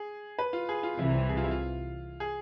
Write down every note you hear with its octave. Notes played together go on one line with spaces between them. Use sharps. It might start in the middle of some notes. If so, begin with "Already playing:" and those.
Already playing: G#4
B4
F4
G#4
F4
C2 C3 E3 E4
G#4
F4
E4
F4
G#4